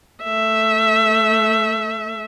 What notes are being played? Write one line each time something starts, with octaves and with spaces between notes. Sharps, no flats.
A3 E5